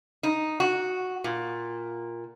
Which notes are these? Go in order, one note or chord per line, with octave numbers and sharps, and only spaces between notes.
D#4
F#4
A#2